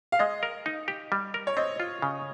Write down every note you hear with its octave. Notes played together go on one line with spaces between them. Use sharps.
F5
G#3 D#5
A#4
D#4
G4
G3
A#4
C#5
C4 D#5
F4
C#3